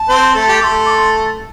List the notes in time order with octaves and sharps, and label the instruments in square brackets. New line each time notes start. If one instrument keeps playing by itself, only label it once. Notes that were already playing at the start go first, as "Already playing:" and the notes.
Already playing: [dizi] A5
[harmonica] C4 C5
A3 A4
G4
[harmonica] A3 A4 [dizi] C6 D6
[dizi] D6
C6